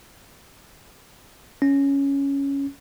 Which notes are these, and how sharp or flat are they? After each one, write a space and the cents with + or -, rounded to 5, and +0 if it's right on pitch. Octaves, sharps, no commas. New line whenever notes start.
C#4 +5